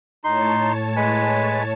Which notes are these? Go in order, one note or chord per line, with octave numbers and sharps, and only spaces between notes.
A2 D#4 C#5 A5 C6
G#3 B4 G#5